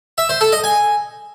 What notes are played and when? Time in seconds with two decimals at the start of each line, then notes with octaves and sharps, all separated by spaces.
0.18 E5
0.29 C5
0.41 A4
0.52 D#5
0.64 G#5